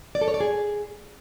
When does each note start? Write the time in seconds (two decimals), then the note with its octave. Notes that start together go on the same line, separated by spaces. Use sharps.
0.15 D5
0.21 A4
0.28 C#5
0.34 D5
0.40 G#4